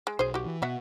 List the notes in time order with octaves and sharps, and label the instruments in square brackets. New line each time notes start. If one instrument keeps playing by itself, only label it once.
[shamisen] G#3
[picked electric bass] B1 [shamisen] G#4 C5
[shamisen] F#4 G4
[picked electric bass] E3
[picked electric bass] B2 [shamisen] F#4 E5 F#5